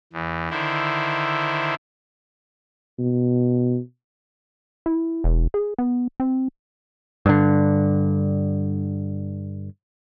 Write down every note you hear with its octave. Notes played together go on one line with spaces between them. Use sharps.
E2
D3 D#3 E4 C5
B2
E4
E1
G#4
B3
C4
G2 D3